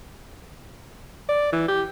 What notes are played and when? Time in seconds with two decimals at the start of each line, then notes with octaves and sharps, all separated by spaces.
1.29 D5
1.53 E3
1.69 G4